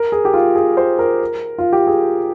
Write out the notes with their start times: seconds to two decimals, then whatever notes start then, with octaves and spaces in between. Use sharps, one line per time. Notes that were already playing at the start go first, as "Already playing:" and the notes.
Already playing: A#4
0.12 G#4
0.25 G4
0.34 F4
0.55 G#4
0.77 C5
0.99 A#4
1.58 F4
1.73 G4
1.87 G#4